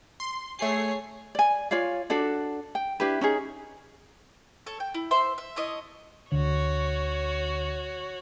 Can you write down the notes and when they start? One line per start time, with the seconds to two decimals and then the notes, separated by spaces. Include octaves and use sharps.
0.20 C6
0.59 A3 G#4 C#5 C7
1.35 D5 G#5
1.71 F4 C#5 D5 F5
2.10 D4 F#4 A4 D5
2.75 G5
3.00 D4 E4 G4 B4
3.21 C#4 D#4 G#4
4.66 A4 C#5
4.80 G5
4.94 E4
5.11 C5 E5 C6
5.38 E5
5.56 D4 E4 C#5 D#5
6.32 D2 D3 F#4 C#5